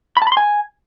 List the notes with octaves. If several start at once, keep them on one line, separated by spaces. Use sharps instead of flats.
B5
A5
B5
C6
G#5